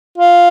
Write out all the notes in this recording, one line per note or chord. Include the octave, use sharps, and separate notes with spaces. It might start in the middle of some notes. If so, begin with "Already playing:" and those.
F4